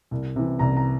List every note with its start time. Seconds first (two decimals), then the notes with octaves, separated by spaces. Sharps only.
0.11 C2
0.36 C3 E3
0.59 C2 A#5
0.77 A#5